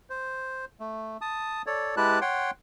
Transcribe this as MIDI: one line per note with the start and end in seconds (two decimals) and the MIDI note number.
0.10 0.65 72
0.80 1.17 57
1.21 1.62 81
1.21 1.62 87
1.67 1.95 69
1.67 1.95 73
1.67 1.95 74
1.97 2.19 56
1.97 2.19 64
1.97 2.19 67
1.97 2.19 71
1.97 2.19 81
1.97 2.19 90
2.21 2.51 73
2.21 2.51 78
2.21 2.51 79
2.21 2.51 84